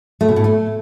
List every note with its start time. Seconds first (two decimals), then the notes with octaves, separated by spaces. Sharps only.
0.21 A3
0.28 B2
0.36 A2
0.44 A3